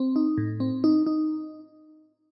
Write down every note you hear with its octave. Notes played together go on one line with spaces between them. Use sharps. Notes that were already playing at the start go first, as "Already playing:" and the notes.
Already playing: C4
D#4
A2
C4
D#4
D#4